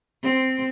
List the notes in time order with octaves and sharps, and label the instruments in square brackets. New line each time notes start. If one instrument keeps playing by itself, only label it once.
[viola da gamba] C4